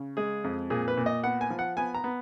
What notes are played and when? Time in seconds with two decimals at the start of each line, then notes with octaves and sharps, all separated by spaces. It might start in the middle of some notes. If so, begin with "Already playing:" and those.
Already playing: C#3
0.17 G#3 G#4
0.44 F2
0.70 A#2 G#4
0.88 B4
0.97 A#2
1.06 D#5
1.23 B3 F#5
1.41 G#5
1.50 F3
1.59 F#5
1.77 B3 G#5
1.94 A#5
2.04 B3